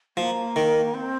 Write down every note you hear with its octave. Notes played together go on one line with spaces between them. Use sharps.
F3 A#3
D#3
C4